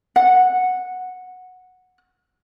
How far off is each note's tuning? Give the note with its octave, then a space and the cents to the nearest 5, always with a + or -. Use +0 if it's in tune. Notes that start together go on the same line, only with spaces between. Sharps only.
F#5 -10